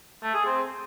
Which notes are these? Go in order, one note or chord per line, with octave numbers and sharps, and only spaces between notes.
A3
G#4
C4